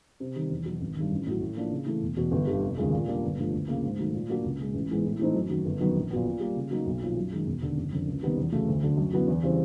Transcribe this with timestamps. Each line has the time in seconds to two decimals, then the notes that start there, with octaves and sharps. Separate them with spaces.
0.20 C3
0.36 D#3 G3
0.51 E2
0.66 B2 F#3
0.81 G#1
0.96 G2 D#3
1.11 A1
1.26 A2 F#3
1.41 A2
1.56 F3 A#3 D4
1.71 C#3
1.86 E3 A3
2.02 E1
2.17 E2 B2
2.32 G1
2.47 G2 D3 G3
2.62 F1
2.78 D#2 C#3 F3 G#3
2.93 A#2
3.08 G3 A#3 D4
3.23 G1
3.39 G2 D3 F3 A3
3.53 D2
3.68 C#3 F3 A#3
3.83 G#2
3.99 D#3 F#3 A3
4.14 A#2
4.29 F#3 A#3 D4 F#4
4.45 C#2
4.59 B2 G#3
4.74 A1
4.89 G#2 E3 G#3 B3
5.05 A2
5.19 E3 A3 C4 D#4
5.34 F#2
5.49 D#3 F#3
5.65 G1
5.80 F#2 D#3 F#3 B3
5.96 A#1
6.11 A#2 F#3 B3
6.26 A#2
6.40 G3 A#3
6.56 C#3
6.71 F#3 A#3 D#4
6.86 B1
7.01 A#2 F3
7.17 F#2
7.32 D#3 G#3
7.47 E1
7.62 D#2 D3
7.77 F#1
7.92 F2 D3
8.07 C#2
8.22 C3 D#3 G3 B3
8.37 E2
8.52 C#3 F#3 A3
8.68 D2
8.83 D3 F#3
8.97 F#2
9.13 D3 F#3 B3 E4
9.28 E2
9.43 C#3 E3 G3 C4